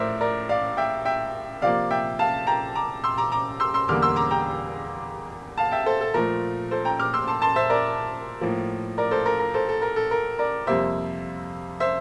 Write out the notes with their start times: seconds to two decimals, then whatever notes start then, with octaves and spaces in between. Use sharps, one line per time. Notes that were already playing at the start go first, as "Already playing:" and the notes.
Already playing: A2 F3 A3 A#4 C5 D5 E5
0.21 A#4 D5
0.49 D5 F5
0.77 E5 G5
1.05 E5 G5
1.62 C3 F3 A#3 D5 F5
1.90 E5 G5
2.19 F5 A5
2.47 G5 A#5
2.75 A#5 D6
3.04 C6 E6
3.18 A#5 D6
3.32 A#5 D6
3.60 C6 E6
3.74 C6 E6
3.88 E2 D3 G3 A#3 D6 F6
4.02 C6 E6
4.16 A#5 D6
4.31 G5 A#5
5.57 F5 A5
5.72 E5 G5
5.86 A4 C5
6.01 A4
6.14 A#2 F3 A3 A#4
6.71 A4 C5
6.85 G5 A#5
6.99 D6 F6
7.14 C6 E6
7.28 A5 C6
7.42 A5 C6
7.56 C5 E5
7.70 A#4 D5
8.41 A2 F3 A#3
8.98 A#4 D5
9.11 A4 C5
9.26 A#4
9.39 A#4
9.54 A4 C5
9.69 A4
9.82 A#4
9.96 A4
10.11 A#4
10.39 A#4 D5
10.67 F2 C3 G3 A#3 C5 E5
11.80 C5 E5